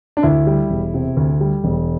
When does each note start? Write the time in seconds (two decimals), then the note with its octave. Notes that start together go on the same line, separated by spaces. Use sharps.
0.17 D4
0.23 D2 E4
0.47 G3
0.70 E1
0.94 C3
1.17 D2
1.41 G3
1.64 E1